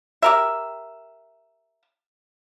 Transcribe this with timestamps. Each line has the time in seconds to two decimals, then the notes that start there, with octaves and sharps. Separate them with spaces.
0.22 G4 A#4 E5